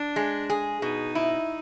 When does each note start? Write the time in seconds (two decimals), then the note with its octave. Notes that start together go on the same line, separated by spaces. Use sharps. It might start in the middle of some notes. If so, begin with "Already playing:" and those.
Already playing: D4
0.16 G#3
0.50 G#4
0.82 B2 D#4
1.15 E4